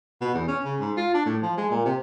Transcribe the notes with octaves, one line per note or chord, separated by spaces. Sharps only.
B2
E2
C#4
C#3
G#2
F4
D4
A2
F3
G#3
A#2
C3